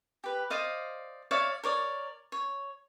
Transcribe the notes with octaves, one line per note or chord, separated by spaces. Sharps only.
G4 B4
C5 D5 D#5 F5
C#5 D5 E5 F5
A#4 C#5 D5
C#5